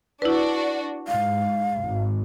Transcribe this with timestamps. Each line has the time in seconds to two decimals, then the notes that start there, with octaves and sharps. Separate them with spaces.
0.22 D4 E4 F#4 B4
1.08 G#2 F5
1.83 G#1